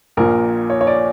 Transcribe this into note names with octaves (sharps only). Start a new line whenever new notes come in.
A#1 A#2 A#4
C#5
C#5
D5